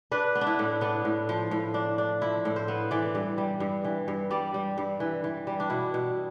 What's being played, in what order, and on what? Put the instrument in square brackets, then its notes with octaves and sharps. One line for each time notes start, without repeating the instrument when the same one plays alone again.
[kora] D4 B4
B3
D4
E4
A2
B3 D4
A2
F3
A2
D4
D4
F3 E4
A2
C5
B3
E3 D5
G2
G3
G2
E3
G2
G3 D5
G3
G2
E3
E3
G3
D4
B2 E4
B2